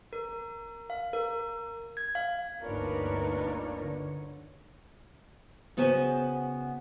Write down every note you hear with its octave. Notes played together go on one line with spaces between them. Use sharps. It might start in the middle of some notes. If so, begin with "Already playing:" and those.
A#4
F5
A#4
G#6
F5
G1 D2 A#2 D4 D#4 A#4 B4 C#5
D3
C#3 B3 F#4 C5 G#5